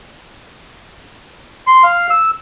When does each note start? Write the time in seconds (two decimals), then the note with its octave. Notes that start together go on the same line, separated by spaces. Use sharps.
1.67 C6
1.83 F5
2.10 E6